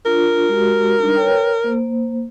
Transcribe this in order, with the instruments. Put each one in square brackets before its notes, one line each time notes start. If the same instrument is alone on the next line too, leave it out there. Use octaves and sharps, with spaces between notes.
[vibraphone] D4 F4 [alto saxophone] A#4
[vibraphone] G#3 F#4 G4
G3 D4 D#4
B4 C#5 G5
A#3 C5